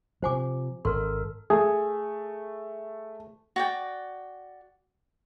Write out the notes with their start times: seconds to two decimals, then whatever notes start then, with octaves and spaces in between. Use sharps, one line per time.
0.22 C3 F3 C5 G#5 D6
0.85 G#1 A4 A#4 C6
1.50 A3 G#4
3.56 F#4 D5 G5